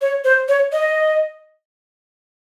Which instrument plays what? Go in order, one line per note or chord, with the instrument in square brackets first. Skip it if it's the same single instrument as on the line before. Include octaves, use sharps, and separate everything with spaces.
[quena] C#5
C5
C#5
D#5